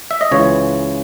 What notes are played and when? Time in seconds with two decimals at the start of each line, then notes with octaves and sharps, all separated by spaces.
0.11 E5
0.21 D#5
0.31 C#2 C#3 E3 C#5